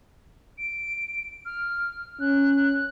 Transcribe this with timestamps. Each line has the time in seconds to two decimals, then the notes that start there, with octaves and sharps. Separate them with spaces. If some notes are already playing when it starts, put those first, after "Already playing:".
0.58 D7
1.45 F6
2.20 C#4 F#6